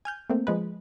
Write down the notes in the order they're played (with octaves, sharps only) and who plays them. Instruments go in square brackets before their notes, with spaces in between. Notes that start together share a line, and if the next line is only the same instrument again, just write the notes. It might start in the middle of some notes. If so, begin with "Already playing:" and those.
[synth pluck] G#5 F6 G6
A3 A#3 C4
F3 G#3 B4